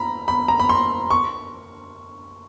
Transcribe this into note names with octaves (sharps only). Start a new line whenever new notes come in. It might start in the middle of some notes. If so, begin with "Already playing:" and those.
Already playing: A#5 B5
B5
A#5
B5
C6
C#6